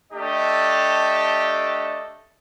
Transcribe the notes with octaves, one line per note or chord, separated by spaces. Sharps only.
A3 D4 G4 A4 D#5